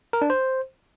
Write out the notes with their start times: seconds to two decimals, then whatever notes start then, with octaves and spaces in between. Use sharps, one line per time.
0.13 A#4
0.22 D4
0.30 C5